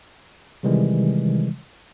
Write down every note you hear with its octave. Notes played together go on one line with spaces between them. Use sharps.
C3 D#3 E3 G3 G#3